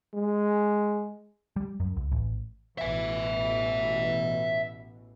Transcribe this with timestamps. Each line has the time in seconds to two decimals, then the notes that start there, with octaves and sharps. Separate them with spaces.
0.14 G#3
1.56 G3
1.80 F#2
1.97 C#2
2.12 A1
2.78 A1 B2 E3 E5 G#5